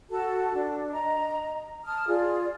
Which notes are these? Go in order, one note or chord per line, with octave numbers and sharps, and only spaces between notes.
F#4 A4 A5
D4
D#5 A#5
A5 D#6 F6
F4 G#4 D5